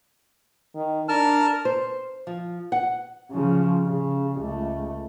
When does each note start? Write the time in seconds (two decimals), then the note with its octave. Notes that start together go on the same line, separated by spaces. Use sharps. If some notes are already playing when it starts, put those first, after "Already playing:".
0.75 D#3
1.09 D4 A#4 A5 F6
1.65 C5
2.27 F3
2.72 F#5
3.32 C#3 F3
3.86 C#3
4.41 C#2 A3